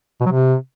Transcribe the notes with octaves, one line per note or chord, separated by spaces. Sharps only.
B2
F#3
C3